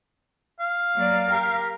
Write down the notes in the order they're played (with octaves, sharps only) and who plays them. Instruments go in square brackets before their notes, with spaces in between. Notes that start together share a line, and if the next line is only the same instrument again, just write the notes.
[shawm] F5
[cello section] F#3 A#3 D5
G4 A#4